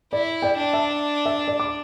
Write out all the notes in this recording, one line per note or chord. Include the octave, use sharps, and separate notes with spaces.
E4 D5
D5 G5
D4
E5 A5
E5
D5
D6